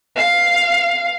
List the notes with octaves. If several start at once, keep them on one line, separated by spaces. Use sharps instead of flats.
F5